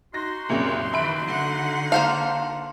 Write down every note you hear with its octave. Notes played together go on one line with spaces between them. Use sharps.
D#4 F#4 C6 A#6
C2 F#2 A#2 C#3
D#3 E3 E5 B5 D7
D3 F#5
A#3 C5 F5 A5